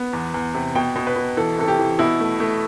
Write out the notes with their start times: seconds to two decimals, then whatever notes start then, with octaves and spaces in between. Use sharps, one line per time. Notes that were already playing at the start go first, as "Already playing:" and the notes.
Already playing: B3
0.13 E2
0.34 E2
0.54 C3
0.75 B2 G5
0.96 B2
1.07 B4
1.16 B2
1.37 E3 A4
1.58 C3 A4
1.68 G4
1.79 E3
1.99 B2 E4
2.20 A3
2.40 A3